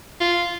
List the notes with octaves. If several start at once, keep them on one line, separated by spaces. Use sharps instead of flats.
F4